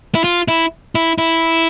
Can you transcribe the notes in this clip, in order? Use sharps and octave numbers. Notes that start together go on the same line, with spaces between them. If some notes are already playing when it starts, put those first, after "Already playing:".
E4
F4
E4
E4
E4